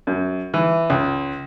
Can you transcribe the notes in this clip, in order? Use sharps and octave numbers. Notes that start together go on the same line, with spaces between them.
F#2
E3
C#2